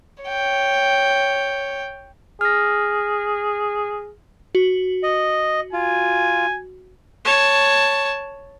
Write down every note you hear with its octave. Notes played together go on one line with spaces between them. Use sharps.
C#5 G5
G#4 F6 A#6
F#4
D#5
F4 G#5
C#5 A5